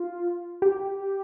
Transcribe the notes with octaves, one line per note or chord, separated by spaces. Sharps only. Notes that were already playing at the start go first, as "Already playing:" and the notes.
Already playing: F4
G4